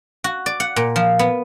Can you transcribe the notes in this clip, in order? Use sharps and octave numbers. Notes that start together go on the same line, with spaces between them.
F#4
D5
F#5
A#2
F3
B3